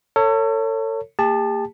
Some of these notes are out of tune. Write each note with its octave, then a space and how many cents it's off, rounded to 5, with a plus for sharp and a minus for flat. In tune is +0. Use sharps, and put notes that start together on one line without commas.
A4 +35 C#5 +0
A#3 -40 G4 +40 A5 -5